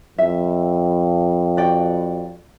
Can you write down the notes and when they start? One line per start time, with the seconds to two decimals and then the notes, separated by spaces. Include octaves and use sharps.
0.18 F2 E5
1.57 F#4 D5 G5